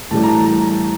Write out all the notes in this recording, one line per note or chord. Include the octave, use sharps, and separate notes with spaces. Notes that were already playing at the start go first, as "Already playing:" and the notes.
A2 E3 G3 A5
A#5
A5
A#5